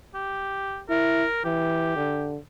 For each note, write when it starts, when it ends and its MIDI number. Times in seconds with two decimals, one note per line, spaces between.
0.15 0.81 67
0.89 1.25 64
0.89 1.41 70
1.45 1.93 52
1.45 2.33 67
1.97 2.37 50